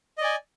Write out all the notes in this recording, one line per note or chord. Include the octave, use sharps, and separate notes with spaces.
D5 D#5 G#5